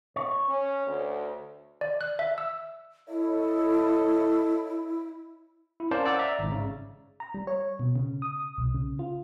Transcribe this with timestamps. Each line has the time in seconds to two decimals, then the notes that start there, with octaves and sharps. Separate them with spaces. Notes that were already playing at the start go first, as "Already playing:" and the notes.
0.16 C#5
0.48 C#4
0.87 D2
1.81 D5
2.01 F#6
2.19 E5
2.38 E6
3.09 E4 A4 C#5 D#5
5.80 E4
5.91 C#4 A#4 C5 D5 F5 A5
6.06 D5 F#5 E6
6.19 D5 E5 A#5
6.39 G#1 G#2
6.52 C#3
7.20 A#5
7.34 G3
7.47 C#5
7.79 B2
7.96 C#3
8.22 D#6
8.58 B1
8.74 C#3
8.99 F4